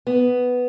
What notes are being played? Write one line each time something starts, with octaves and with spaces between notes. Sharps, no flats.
B3